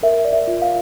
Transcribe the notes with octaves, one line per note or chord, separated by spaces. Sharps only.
A#4 E5
D5
E5
F4
F5